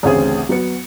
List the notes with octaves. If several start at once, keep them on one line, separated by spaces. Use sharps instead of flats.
A1 D2 C#3 C4 G#4
F#3 B3 C#7